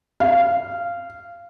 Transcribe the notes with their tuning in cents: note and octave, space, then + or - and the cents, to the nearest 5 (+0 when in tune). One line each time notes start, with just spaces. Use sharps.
F5 -15